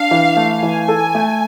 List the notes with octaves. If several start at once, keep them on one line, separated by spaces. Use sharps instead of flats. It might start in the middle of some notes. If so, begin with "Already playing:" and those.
Already playing: D4 F5
E3
A3
E3 G#5
A4
A3